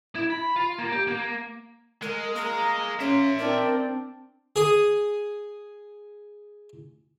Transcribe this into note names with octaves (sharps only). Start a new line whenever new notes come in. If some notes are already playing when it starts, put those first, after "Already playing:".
E4
B5
F4
A#3
G4
A#3
G#3 A#4
A#3 A#5
C#4 E5 C6
C4 D4 A#4
G#4 D#6